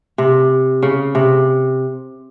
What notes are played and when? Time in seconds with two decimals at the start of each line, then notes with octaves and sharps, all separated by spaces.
0.18 C3
0.83 C#3
1.15 C3